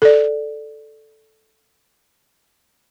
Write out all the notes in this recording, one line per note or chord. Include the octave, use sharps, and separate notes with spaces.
A4 D5